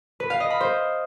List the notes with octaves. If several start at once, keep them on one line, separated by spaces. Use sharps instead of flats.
B4
F5
D#5
B5
C5